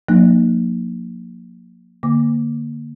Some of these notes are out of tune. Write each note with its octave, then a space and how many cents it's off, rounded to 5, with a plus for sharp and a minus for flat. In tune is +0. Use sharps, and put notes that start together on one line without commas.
F3 +45 A#3 +0 D#4 -35
D3 +10 A#3 +0 D6 +0